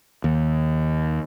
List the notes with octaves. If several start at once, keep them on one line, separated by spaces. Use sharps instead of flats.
D#2